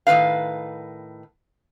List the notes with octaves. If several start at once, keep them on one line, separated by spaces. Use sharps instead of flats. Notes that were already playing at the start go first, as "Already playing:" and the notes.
A2 D#3 G#3 B4 F5